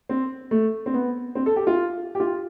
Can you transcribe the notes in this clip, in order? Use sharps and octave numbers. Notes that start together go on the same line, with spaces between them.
C4
A3
C4
B3
C4
A4
G4
F4
G4
F4